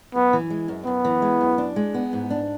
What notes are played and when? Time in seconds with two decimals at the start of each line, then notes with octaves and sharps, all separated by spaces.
0.15 F#2 B3
0.33 E3
0.50 G#3
0.68 F#2
0.86 F#2 B3
1.05 E3
1.22 G#3
1.41 F#2
1.58 D4
1.76 G#3
1.94 B3
2.13 G#2
2.30 D4